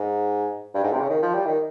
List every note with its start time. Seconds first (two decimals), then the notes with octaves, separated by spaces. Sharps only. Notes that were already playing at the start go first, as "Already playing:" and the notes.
Already playing: G#2
0.74 G2
0.83 G#2
0.92 C3
1.01 C#3
1.10 D#3
1.22 F3
1.34 G3
1.46 D#3